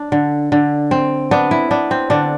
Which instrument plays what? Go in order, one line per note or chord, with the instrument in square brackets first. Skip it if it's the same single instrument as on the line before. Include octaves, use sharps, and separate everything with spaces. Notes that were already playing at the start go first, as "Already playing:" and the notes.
Already playing: [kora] D4
D3
D3
C4
B3 D4
E4
B3 D4
C4
D3 D4